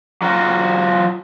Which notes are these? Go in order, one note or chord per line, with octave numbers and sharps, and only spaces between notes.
F#3 F4 F#4